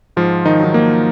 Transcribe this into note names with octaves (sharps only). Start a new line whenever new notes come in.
G#2 F3 F4
D#3 D#4
D#3 F#3
A#3